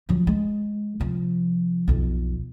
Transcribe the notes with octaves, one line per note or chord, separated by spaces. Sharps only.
F3 F#3
G#3
C3 F3
B1 F2